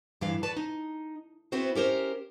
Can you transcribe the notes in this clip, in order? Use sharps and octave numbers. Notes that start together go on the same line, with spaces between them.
G2 E3 E4 F5
F#4 B4 D5 A5
D#4
B3 C4 E4 F#4 C5
C#4 G4 A#4 C5